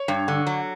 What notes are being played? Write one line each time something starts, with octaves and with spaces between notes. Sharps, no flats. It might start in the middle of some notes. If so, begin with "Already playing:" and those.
Already playing: C#5
G2
D3
F#3